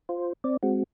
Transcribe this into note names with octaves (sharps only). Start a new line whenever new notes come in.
F4 C5
C4 D5
G#3 C4 F#4